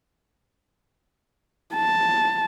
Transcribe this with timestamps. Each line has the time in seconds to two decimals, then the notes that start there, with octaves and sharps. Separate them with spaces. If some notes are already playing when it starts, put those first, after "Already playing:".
1.75 A5